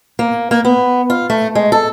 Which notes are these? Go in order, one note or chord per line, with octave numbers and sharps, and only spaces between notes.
A#3
A#3
B3
F4
A3
G#3
A4